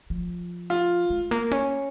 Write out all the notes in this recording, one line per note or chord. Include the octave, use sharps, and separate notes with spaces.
F3
F4
G#3
A#3
C#4